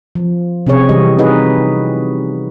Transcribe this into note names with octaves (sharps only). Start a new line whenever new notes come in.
F3
C3 C4 C#4 G#4 C#5
C3 E3 G3 G4 D#5
D#4 F#4 G#4 B4 D#5